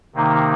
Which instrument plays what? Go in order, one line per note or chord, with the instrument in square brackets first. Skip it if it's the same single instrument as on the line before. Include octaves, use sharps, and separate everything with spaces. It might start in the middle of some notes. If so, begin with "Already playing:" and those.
[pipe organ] C3 D#3 A#3 D#4